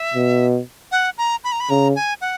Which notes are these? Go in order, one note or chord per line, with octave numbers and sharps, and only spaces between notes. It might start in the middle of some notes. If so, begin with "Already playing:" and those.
Already playing: E5
B2
F#5
A#5
B5
A#5
B5
C#3 A#5
G#5
F#5